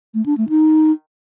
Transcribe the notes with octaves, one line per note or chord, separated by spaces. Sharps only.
A3
D4
A3
D#4